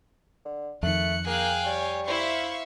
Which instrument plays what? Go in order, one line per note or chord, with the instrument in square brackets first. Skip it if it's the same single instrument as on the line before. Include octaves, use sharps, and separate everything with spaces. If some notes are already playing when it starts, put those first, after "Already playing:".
[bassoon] D3
[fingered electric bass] F2 D#3 [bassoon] A3 [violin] F#6 C#7
[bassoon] A#3 [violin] G#4 F#6 [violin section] F5 G5 G#5
[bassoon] G3 [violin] C#5
[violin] E4 C5 [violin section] E5 F5 C#6